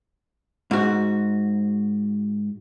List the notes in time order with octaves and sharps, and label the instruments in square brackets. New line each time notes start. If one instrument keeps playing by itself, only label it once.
[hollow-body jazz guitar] G#2 F#4